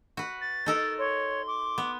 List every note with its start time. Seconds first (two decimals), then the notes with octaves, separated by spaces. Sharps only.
0.17 F#4 B4
0.41 A6
0.66 D#4 A4 A#4
0.99 C#5 C6
1.47 D6
1.78 B3